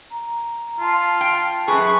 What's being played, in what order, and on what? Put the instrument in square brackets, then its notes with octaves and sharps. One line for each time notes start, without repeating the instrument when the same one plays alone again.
[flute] A#5
[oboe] F4 [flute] A5
[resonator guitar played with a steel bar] G5 [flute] A5
[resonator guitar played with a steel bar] F#2 G#4 [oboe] B4 [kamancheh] C#6